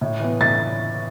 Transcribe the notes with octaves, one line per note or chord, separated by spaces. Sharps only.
A2
E3 B3
A2 A6